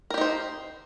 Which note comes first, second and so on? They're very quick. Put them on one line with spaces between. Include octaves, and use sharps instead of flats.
A#4 G4 D#4 C5